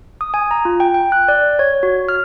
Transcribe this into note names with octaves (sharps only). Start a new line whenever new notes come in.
D#6
G#5
A#5
F4
G5
G5
F#6
D5
C#5
F#4
F6